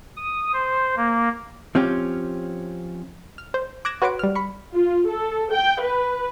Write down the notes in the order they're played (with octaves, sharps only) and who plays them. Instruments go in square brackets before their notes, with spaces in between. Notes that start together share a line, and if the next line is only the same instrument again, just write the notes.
[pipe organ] D#6
C5
A#3
[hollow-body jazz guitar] F3 C4 C#4 F4 G4
[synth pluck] F6
C5
D6 F#6 G#6 A#6 E7
F#4 B4 C#5 F#5 C6 D6
G3 F6
B5 C#6
[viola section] F4
A4
G5
B4